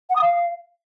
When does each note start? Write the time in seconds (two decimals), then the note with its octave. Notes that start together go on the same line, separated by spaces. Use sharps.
0.09 F#5
0.15 D#6
0.21 F5